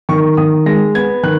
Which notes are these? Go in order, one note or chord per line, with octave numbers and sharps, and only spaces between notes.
D#3 C#6
D#3 D#6
G#3 A#6
B3 G#6
D#3 F#6